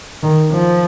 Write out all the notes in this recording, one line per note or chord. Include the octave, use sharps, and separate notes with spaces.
D#3
F3